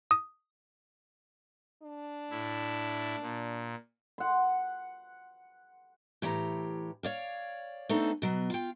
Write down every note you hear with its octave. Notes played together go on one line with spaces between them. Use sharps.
D#6
D4
A2 E4
A#2
F#5 C6
A2 E3 G4 A#5
C#5 D5 F5
A3 B3 C4 D4 D#4 A4
B2 F#3
F4 G5